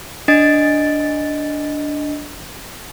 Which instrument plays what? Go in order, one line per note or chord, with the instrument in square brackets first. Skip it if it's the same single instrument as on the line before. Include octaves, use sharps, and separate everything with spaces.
[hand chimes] D4 D#5 A6 D7